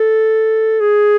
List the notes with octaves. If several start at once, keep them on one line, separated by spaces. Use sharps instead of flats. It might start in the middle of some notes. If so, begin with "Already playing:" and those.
Already playing: A4
G#4